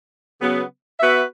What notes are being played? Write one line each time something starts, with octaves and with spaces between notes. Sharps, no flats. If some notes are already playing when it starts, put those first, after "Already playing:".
C#3 F#3 B3
B3 F#4 B4 E5